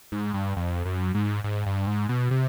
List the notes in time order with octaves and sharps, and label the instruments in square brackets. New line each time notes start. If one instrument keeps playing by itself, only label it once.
[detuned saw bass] G#2
G2
F2
F#2
G#2
G#2
G2
G#2
B2
C3